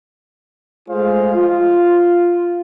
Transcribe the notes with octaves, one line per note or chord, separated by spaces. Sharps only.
G#3 A3 F4 G#4 C5 F5
F4